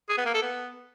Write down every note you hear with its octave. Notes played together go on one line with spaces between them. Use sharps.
G#4
B3
A#3
A4
B3